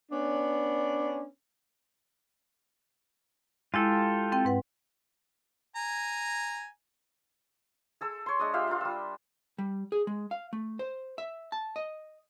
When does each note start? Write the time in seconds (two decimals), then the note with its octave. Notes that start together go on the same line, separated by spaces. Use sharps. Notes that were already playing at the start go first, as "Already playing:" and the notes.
0.11 B3 C#4 D4
3.74 G#3 E4 F4 G4 A4
4.32 C4 G5
4.45 G#2 B4 F#5
5.76 G#5 A#5
8.01 G#4 A4 E6
8.26 C#5 C6
8.39 G#3 D4 D#6
8.53 F4 G4 E5 F5
8.67 F4 A#4 F5
8.81 G3 E6
9.58 G3
9.92 G#4
10.07 G#3
10.31 F5
10.53 A3
10.79 C5
11.18 E5
11.52 A5
11.76 D#5